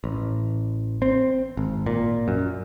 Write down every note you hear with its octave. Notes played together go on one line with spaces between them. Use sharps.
A1
C4
G#1
A#2
F#2